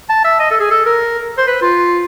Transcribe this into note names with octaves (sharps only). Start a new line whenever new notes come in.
A5
E5
D#5
A4
G#4
A4
A#4
C5
B4
F4